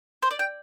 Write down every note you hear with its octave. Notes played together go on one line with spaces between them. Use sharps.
C5
D5
G5